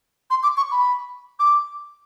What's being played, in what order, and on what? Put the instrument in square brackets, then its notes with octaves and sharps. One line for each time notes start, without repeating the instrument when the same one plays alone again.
[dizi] C6
D6
C#6
B5
D6